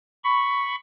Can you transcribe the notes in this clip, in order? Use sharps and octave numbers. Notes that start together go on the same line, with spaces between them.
B5 C#6